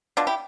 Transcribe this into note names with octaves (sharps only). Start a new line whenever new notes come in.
B2 D4 F4
E4 G4